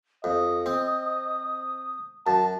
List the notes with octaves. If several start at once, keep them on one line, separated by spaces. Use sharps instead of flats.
F2 D#5 D#6
C4
F#2 A5